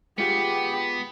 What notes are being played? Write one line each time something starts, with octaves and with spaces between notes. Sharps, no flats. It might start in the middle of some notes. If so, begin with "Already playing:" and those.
G#3 B3 F4 G4 G#4